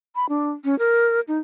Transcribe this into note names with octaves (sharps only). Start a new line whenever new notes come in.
B5
D4
C#4
A#4
D#4